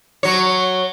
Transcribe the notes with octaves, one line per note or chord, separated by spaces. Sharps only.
F#3 C#5